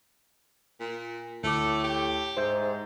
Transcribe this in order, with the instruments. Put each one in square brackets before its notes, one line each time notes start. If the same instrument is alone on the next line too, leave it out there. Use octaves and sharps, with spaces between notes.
[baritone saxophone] A#2
[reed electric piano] D2 D6 [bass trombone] A2 [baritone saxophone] A3
[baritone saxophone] G4
[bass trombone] G#2 [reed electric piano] C5 E5 G6